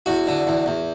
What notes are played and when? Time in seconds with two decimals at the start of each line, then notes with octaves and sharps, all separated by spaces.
0.06 E2 F#4
0.27 D3
0.47 E2
0.66 E2